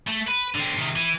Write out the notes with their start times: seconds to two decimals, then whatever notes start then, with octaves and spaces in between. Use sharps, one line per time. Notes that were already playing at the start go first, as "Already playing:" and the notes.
0.07 A3
0.27 B4
0.55 D3 C4
0.77 C3 D#3
0.96 E3